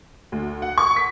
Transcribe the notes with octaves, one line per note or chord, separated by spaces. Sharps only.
D2
F#5
C#6
B6